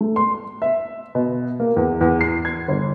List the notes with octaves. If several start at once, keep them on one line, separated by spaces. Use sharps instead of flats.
A3
C6
E5
B2
A#3
E2
E2
C7
G#6
G1